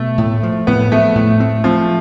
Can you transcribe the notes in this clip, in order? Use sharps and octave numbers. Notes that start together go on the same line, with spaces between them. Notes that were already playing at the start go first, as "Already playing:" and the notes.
Already playing: B2 A3
A2
F3
A2 B3
F3 A3
A2
C4
F3 C4